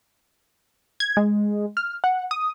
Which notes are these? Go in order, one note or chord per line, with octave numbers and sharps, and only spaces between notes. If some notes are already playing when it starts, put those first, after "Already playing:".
G#6
G#3
F6
F#5
D#6